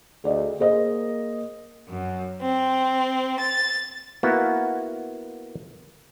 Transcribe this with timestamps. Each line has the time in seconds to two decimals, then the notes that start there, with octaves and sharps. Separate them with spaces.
0.24 D2 G#4 D5 D#5
0.60 A#3 G#4 C5 D#5
1.89 F#2
2.41 C4
3.38 A6
4.23 A#3 B3 E4 F#4